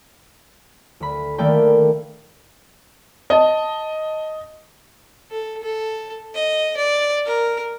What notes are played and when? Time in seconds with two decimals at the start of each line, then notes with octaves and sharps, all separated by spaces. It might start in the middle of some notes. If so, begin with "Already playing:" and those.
1.00 D2 B5
1.38 D#3 A3 A#3 D5 G5 B5
3.30 D#5 A5
5.31 A4
5.63 A4
6.34 D#5
6.77 D5
7.26 A#4